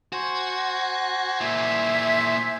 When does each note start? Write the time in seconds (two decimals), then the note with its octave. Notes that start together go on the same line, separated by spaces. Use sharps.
0.13 F#4 C5 G#5
1.41 A#2 E4 E5